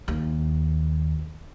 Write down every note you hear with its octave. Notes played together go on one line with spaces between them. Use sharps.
D#2